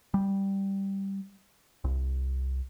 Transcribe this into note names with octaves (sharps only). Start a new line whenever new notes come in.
G3
C2